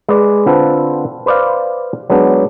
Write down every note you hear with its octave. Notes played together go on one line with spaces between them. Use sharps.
G#3 G#4 B4 D5
D3 C4 F4 A4 B4 C5
B4 C5 D5 D#5 F5
F#3 G#3 B3 D4